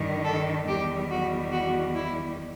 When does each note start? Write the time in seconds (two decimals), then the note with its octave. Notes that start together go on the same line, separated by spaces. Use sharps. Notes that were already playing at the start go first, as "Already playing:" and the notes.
Already playing: G2 D#3 G3
0.24 A4
0.67 E2 D#3 G3 G4
1.09 F#4
1.52 F#4
1.94 E4